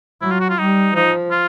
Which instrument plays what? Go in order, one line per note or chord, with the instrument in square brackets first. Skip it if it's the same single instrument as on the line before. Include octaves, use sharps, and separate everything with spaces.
[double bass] F#3 [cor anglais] E4
[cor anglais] F4
F#4
F4
[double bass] G3 [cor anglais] D#4
[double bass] F3 [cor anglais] D#4
[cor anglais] F4